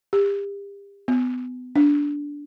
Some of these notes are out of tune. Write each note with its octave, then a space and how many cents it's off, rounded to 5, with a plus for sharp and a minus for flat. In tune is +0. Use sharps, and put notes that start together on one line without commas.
G4 +35
B3 +30
D4 -10